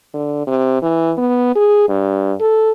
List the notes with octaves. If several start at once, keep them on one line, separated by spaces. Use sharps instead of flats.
D3
C3
E3
B3
G#4
G2
A4